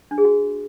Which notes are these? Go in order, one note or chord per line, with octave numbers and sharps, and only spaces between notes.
D4
G#4
F#4